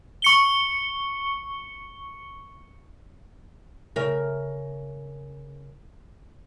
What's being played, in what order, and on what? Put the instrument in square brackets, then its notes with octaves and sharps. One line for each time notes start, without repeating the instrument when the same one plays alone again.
[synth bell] C#6 C#7 G7
[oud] C#3 A#4 E5